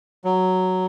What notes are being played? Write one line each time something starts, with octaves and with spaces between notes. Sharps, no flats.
F#3